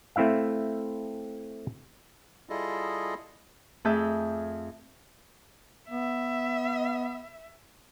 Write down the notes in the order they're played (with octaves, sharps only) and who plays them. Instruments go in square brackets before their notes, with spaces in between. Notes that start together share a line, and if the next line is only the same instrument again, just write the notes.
[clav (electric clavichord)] A3 C4 E4 E5 F5
[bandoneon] G3 E4 F4 G#4 A4 D#5
[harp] F2 A3 G#4 E5 A5 G6
[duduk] B3 [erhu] E5